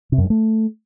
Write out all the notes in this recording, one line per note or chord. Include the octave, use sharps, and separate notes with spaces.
C3
F#2
G2
A3